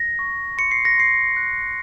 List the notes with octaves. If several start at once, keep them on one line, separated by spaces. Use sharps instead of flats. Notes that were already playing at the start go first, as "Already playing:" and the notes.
Already playing: A#6
C#6
C6 C#7
C7
A#6
C6 C7
F#6